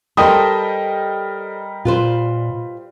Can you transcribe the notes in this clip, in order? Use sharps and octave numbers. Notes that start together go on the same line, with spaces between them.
G3 A4 A#4 C5 D#5 G5 D#6
A#2 F4 B4 C5